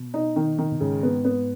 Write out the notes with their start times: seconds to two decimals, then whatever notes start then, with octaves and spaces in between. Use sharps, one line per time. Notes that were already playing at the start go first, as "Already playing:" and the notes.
Already playing: B2
0.14 D#4
0.36 D#3
0.58 D#3
0.72 B2
0.80 G#2 C#3
1.03 B3
1.25 B3